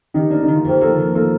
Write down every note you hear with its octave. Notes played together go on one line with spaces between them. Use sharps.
D#3 D#4 G4
A#3 D4
D#4
D#3
F4
F2 G4
A#3 F4 A4
D#3
A#3 F4 A4